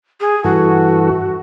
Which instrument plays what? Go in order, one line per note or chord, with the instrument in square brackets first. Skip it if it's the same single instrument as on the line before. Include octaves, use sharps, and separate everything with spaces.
[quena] G#4
[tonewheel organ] G2 E3 A4 [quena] F#4